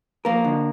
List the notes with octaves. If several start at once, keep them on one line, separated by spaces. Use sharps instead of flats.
F3 A#3 A#4
D3